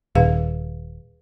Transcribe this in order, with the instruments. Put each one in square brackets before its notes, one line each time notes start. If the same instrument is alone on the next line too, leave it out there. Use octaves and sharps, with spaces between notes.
[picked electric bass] D#1 [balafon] G#4 B4 F5